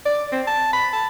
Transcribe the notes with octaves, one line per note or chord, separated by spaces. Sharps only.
D5
C4
A5
B5
A5